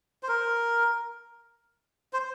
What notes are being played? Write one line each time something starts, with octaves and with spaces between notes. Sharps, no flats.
C5
A#4
C5